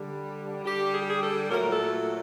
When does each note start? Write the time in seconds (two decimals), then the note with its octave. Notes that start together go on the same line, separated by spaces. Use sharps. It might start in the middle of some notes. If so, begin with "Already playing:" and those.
Already playing: D3 G3
0.65 D3 G3 G4
0.94 G#4
1.02 G4
1.10 G#4
1.23 A4
1.50 A#2 F#3 A3 A#4
1.72 A4